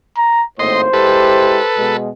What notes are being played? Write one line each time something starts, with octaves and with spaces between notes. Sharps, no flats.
A#5
G#1 A2 A#3 C5 D#5 C6
G#3 E4 G4 A4 B4
B2 G#3